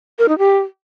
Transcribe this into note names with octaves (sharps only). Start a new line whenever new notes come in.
A#4
D#4
G4